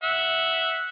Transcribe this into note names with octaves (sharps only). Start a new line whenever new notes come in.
E5 F#5